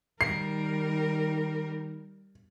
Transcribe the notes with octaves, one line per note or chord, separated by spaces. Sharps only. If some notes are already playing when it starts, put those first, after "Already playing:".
D#3 G3 A#4 C7